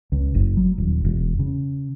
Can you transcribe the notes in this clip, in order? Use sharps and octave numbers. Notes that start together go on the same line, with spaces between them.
C#2
F#1
F#3
D#1
E1
C#3